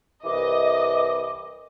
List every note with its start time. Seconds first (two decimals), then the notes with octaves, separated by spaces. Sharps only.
0.25 C2 E3 D#5 D6